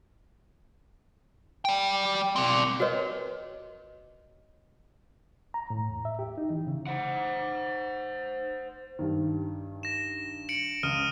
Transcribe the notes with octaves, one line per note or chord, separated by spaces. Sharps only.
D5 G5
C4 D5
F#4 A#4 B4 C#5 D#5
A#5
A2
E2
E5
G4
D#4
E3
C#3
C5 F#5
G2 D#3
A#6 E7
C#7 D7 F#7
C#2 D#6 F6 D#7